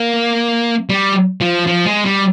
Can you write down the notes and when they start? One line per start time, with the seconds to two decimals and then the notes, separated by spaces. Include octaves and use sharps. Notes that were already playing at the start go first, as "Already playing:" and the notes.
Already playing: A#3
0.89 G3
1.41 F3
1.67 F3
1.86 G#3
2.05 G3